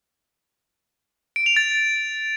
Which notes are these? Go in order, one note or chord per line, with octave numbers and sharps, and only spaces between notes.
D7
F7
A6